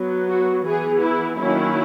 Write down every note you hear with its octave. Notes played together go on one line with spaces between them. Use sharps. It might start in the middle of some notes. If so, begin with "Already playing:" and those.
Already playing: F#3 B3
F#4
E3 B3 G#4
E4
D#3 F#3 A#3 C#4 E4